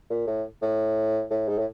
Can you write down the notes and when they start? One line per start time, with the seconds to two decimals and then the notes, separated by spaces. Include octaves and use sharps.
0.10 A#2
0.27 A2
0.62 A2
1.30 A2
1.48 G#2
1.58 A2